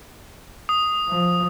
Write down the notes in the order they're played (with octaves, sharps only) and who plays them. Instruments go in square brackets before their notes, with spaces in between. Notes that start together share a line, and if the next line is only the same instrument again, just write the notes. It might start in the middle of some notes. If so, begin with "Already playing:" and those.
[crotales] D#6
[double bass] F3